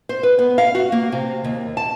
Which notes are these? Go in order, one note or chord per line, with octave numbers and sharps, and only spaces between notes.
C5
B4
B3
F5
F#4
A#3
C3
D#2
A5